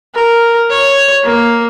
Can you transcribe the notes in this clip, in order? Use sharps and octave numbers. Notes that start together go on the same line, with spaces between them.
A#4
C#5
A#3